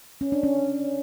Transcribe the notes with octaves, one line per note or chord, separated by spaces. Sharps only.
C#4
D4
C#4